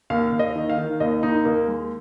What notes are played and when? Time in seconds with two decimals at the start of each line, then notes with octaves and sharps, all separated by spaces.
0.10 D#2 F5
0.32 D#2
0.39 D#5
0.55 D#3
0.69 F5
0.77 D#3
1.00 D#2 D#5
1.23 D#2 D#4
1.45 D#2 A#3
1.68 G#3